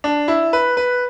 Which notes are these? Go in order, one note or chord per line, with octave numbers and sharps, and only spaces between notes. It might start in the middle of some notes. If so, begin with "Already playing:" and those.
D4
E4
B4
B4